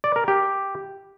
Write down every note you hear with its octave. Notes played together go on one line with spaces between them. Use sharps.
D5
A#4
G4